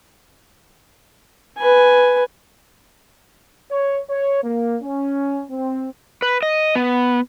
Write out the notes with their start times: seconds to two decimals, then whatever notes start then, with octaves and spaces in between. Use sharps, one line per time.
1.58 B4 G#5
3.71 C#5
4.10 C#5
4.44 A#3
4.83 C#4
5.51 C4
6.22 B4
6.42 D#5
6.75 B3